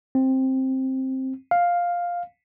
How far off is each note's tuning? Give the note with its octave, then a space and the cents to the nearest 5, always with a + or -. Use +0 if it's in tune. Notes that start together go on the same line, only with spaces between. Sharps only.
C4 +10
F5 +5